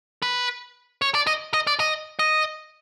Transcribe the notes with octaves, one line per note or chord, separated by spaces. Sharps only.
B4
C#5
D5
D#5
D#5
D5
D#5
D#5